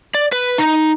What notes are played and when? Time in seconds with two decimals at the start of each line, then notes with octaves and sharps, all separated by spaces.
0.14 D5
0.32 B4
0.58 D#4